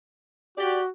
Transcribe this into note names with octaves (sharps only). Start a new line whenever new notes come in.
F#4 G4 D5